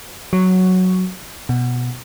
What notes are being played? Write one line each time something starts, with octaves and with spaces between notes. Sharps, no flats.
F#3
B2